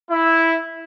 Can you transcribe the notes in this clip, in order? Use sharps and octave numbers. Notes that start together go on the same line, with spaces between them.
E4